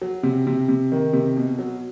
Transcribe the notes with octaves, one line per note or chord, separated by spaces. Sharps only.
F#3
C3
C3
C3
D#3
C3
B2
F#3